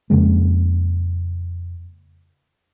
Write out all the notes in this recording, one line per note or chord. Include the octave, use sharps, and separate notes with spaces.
F2 C#3 G#3 A#3